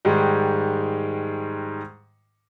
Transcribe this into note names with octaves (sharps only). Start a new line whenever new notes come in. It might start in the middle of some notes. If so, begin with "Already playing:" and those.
G#2 D#3 G3 G#3